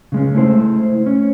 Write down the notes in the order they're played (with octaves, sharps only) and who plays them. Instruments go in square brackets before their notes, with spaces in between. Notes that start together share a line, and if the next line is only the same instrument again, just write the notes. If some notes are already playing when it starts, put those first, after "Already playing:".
[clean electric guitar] C#3 G#3 C#4
A3 E4 C5
C#4